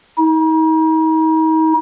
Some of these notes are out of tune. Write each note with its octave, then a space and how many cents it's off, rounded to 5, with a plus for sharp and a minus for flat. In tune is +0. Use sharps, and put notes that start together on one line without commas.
D#4 +40